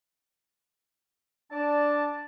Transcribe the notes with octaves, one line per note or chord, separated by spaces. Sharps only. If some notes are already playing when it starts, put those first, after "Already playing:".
D4 D5 A5